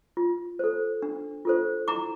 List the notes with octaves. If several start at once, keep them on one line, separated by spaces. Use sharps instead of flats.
F4
A4 C5
D4
F4 A4 C5
E4 A#5 D6